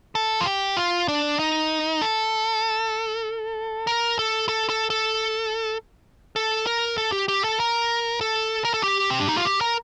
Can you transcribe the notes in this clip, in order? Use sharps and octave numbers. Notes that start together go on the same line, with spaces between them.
A4
F4
G4
F4
D4
D#4
A4
A#4
A4
A4
A4
A4
A4
A#4
A4
G4
G4
A4
A#4
A4
A#4
A4
G4
C4
D4
D#4
F4
G4
A#4